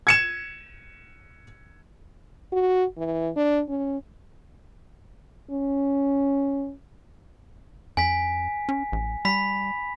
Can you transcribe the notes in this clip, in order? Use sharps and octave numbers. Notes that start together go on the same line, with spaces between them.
G#6 C#7 E7
F#4
E3
D4
C#4
C#4
F2 G#5 B6
C#4
A1
G3 B5 B6